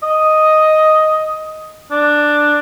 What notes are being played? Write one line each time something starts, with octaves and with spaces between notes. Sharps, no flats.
D#5
D4